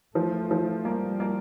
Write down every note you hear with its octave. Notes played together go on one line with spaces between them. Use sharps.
F3 A3
F3
G3 A#3
A#3